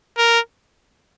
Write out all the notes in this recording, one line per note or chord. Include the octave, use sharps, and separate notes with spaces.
A#4